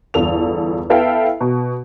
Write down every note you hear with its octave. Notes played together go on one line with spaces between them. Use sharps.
G1 E2 A4 F7
B3 E4 A4 E5 F5 G5
B2